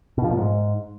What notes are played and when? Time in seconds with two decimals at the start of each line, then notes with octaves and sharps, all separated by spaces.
0.18 B2
0.24 F3
0.31 A#2
0.37 G#2